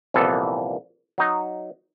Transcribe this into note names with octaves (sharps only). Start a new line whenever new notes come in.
C2 F2 A#2 E3 B3 A4
F#3 D#4